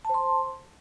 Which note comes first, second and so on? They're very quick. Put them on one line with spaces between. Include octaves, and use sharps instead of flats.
A5 C5 C6